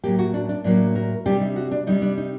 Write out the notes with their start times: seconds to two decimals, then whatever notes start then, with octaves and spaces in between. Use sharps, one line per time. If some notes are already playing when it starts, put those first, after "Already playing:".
0.04 A2 F#3 A#3 G4
0.19 F#4
0.34 D4
0.49 D4
0.64 A2 F#3 A#3 D4
0.95 A#4
1.26 C3 G3 D4 G4
1.41 D#4
1.56 F#4
1.71 D4
1.87 C3 G3 D4 D#4
2.02 D4
2.18 D#4